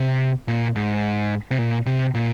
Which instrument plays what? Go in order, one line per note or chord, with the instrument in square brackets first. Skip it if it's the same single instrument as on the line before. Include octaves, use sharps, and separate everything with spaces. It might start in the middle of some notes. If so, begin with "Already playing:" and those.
Already playing: [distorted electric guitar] C3
A#2
G#2
C3
A#2
C3
A#2